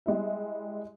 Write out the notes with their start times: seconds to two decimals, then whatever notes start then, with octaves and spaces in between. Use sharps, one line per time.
0.06 G3 G#3 E4 E5